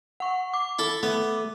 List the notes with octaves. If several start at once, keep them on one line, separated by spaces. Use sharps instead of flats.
F#5 C#6
D6
E4 A4
A3 B3